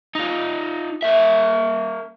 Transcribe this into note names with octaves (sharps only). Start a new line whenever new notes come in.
D#4 F4
A#3 E5